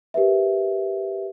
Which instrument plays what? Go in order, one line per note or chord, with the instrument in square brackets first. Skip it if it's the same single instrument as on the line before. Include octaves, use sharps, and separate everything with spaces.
[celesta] G4 A#4 B4 E5